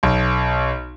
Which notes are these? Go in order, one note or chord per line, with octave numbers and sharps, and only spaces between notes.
B1